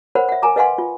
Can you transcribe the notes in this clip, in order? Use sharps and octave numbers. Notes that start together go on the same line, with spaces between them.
A#4 C5 C#5 F#5 B5
E5 F#5
A#4 G#5 A#5 D6
B4 D#5 F5 F#5 G#5 C6
F4